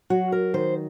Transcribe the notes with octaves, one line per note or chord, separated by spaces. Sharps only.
F#3 F#4
A#4
D#3 C5